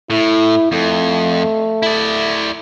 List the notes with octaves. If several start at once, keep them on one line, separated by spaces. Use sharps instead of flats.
A2 E4
F2 A3
E4 D5